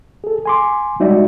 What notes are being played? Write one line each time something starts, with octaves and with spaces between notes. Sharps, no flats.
G#4 A4
G#5 C6 D6
G3 G#3 D#4 F#4 D5 E5